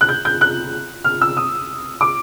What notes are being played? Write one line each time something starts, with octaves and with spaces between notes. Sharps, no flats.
F#6
G6
G6
F#6
F6
E6
D#6
D6